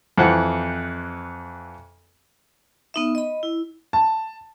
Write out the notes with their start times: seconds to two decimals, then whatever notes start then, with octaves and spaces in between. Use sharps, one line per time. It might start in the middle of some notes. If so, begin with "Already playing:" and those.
0.18 F2 E3 C4 F#5
2.94 B3 D#4 E5
3.15 D#5 B5
3.43 E4
3.93 A5